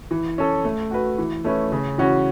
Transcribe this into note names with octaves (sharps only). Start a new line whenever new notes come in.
E3
C#4 A4
A3
F#4 B4
E3
A3 C#4 E4 B4
C#3
E3 C#4 F#4